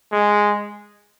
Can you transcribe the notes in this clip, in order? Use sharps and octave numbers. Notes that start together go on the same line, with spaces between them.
G#3